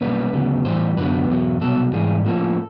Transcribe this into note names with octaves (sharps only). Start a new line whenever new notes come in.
B1 A#2 G3 A#3 C#4 B4
D2 C#3 F#3 B3
A2 E3 G3 C5
F#2 D3 F#3 B3 B4
E2 B2 F#3
C2 B2 F#3 A4
G#2 E3 G3 G#4
A2 F3 A#3 C#4 A4